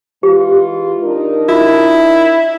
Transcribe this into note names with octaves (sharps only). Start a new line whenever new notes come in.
E3 G#3 F4 G4
D4 D#4 A#4
E4 F4